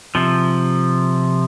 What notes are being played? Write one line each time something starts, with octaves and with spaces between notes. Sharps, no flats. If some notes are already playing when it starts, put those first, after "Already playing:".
C3 F3